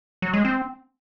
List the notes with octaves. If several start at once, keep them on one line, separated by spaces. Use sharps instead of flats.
F#3
G#3
C4